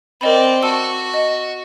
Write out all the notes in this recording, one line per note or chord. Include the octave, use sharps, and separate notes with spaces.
C4 A#4 D5 D#5 B5
F#4 A5 E6
D#5